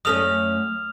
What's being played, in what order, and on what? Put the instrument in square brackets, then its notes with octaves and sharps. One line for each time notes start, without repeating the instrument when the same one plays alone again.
[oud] F#2 A3 C#4 [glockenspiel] D#6 F6 F7